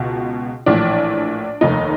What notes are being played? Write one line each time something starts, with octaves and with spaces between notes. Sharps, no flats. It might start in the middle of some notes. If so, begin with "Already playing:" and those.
Already playing: C#2 B2
A#1 A2 E3 D4
F1 D#2 D#3 D#4